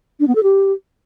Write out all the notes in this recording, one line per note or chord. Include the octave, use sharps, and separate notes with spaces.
D4
B3
A4
G4